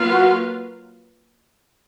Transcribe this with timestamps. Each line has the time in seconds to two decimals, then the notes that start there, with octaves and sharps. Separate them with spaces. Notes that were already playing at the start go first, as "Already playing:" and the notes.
Already playing: F#3 A#3 F4 B4 F5
0.12 F#4